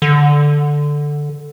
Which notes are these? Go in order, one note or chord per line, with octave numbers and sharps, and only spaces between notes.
D3